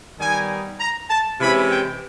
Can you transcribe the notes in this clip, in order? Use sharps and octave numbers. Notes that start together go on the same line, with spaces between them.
D#3 G3 B3 D#4 G#5
A#5
A5
C3 E3 G#3 C#4 E4 B5
G5